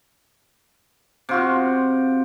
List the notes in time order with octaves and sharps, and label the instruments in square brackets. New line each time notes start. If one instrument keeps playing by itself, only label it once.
[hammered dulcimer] C3 F4 F#4